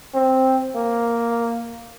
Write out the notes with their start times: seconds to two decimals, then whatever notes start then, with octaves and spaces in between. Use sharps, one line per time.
0.14 C4
0.75 A#3